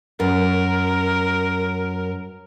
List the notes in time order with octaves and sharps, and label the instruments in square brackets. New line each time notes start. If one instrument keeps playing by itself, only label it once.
[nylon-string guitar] F#2 [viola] A#4